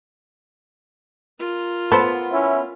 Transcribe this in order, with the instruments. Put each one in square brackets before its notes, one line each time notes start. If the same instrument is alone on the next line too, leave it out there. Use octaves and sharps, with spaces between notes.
[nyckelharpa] F4 A#4
[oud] B3 [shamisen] A4 C5
[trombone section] C#4 E4